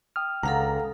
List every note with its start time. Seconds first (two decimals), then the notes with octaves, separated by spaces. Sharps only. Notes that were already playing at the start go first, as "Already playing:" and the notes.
0.16 G5 D#6 F6
0.43 C#2 A4 F5 F#5 A#5